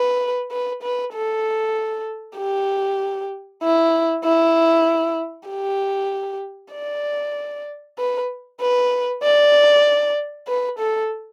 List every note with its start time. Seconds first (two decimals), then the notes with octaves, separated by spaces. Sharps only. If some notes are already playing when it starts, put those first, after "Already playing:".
Already playing: B4
0.51 B4
0.83 B4
1.14 A4
2.38 G4
3.63 E4
4.24 E4
5.49 G4
6.74 D5
7.99 B4
8.61 B4
9.23 D5
10.48 B4
10.79 A4